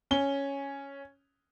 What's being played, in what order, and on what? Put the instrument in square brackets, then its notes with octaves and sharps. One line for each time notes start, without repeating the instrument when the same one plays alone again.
[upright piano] C#4 G7